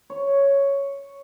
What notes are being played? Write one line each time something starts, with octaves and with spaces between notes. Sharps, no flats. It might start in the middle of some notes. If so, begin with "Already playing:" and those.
C#5